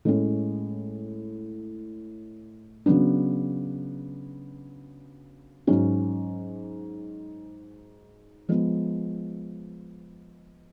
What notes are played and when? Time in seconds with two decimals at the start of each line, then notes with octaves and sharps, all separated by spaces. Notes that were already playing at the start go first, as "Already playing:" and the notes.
0.05 A2 G#3 C#4
2.86 C#3 F#3 B3 D4
5.67 G#2 F#3 C#4 F#4
8.49 F3 G#3 B3